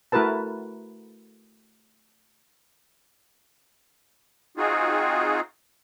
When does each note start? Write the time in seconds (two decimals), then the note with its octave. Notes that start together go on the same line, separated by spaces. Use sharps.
0.12 A3 E4 F#4 A#4 B4 A5
4.57 C4 D#4 F4 F#4 G#4